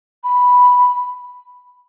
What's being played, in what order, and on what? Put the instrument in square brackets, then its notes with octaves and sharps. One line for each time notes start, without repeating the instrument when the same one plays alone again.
[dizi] B5